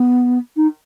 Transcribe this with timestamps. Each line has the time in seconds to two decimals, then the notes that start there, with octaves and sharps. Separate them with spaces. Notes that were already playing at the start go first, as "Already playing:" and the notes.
Already playing: B3
0.56 D#4